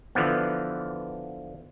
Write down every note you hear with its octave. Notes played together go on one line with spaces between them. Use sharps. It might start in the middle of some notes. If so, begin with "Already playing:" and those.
D3 E3 F3 B3